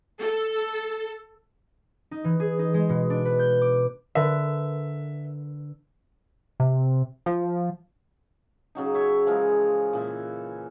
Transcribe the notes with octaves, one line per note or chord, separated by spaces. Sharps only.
A4
D#4
E3
G#4
D#4
G#3
B2
D4
B4
G6
D6
D3 A#4 B4 E5
C3
F3
C#3 F#3 D#4
C#5 E5
E3 F3 G#3 A#4
A#2 E3 E5